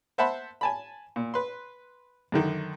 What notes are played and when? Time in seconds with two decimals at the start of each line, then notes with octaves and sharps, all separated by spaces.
0.18 C5 E5 F#5 A5 B5 C6
0.61 G#5 A5 B5
1.16 A#2
1.34 B4 C6
2.32 F#2 D3 D#3